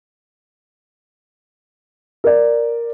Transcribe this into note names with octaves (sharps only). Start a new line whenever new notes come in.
A#4 D5